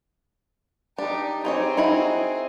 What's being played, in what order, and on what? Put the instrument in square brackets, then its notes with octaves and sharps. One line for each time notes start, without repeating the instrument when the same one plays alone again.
[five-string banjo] D4 [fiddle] D#4 G4
[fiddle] C4 G#4 [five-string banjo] D#4 G4 C#5
[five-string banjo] D#4 E4 F#4